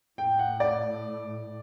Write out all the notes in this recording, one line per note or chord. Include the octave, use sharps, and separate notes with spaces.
A2 G5
F#5
D5